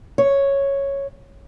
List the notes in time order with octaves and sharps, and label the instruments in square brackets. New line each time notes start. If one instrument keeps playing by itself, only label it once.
[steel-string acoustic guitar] C#5